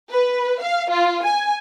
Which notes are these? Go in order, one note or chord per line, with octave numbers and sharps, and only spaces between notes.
B4
F5
F4
G#5